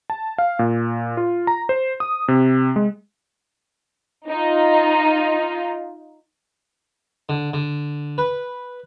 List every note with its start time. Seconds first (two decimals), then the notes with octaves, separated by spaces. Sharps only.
0.10 A5
0.38 F5
0.59 A#2
1.17 F4
1.47 A#5
1.69 C5
2.00 D#6
2.28 C3
2.76 G#3
4.29 D#4 F4
7.29 D3
7.53 D3
8.18 B4